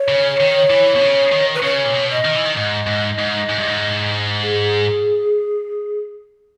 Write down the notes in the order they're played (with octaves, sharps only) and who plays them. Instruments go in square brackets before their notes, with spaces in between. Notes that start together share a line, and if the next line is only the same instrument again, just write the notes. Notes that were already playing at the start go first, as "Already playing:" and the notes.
Already playing: [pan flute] C#5
[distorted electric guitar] C#3
D#3
E3
B2
C#3
D#3
[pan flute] B4
[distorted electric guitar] C#3 [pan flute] C#5
[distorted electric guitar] A#2
B2
[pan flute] D#5
[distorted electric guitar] D#3
E3
D#3
[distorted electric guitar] G#2 [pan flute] D#5
[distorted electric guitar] G#2
G#2
G#2
G2
G#2
[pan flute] G#4